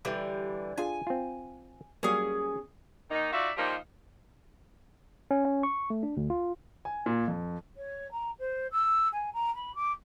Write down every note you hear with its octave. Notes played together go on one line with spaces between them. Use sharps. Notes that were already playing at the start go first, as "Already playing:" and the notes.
D3 E3 G3
D4 F4 G#4 G#5
C4 F4
F#3 G3 A#3 C#4 G#4
D#3 A#3 D#4
D#4 F4 F#4 D5 E5
D#3 F3 G3 A#3 D#4 F4
C#4
C#4
C#6
A3
D4
D2
F4
G#5
A#2
F2
C#5
A#5
C5
E6
G#5
A#5
B5
D6